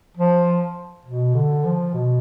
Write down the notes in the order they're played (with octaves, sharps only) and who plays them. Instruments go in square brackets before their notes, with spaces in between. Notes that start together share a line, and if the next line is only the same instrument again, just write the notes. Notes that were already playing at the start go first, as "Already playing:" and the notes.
[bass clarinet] F3
B2
D3
F3
B2